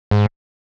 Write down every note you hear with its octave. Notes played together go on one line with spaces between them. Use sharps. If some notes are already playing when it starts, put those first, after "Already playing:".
G#2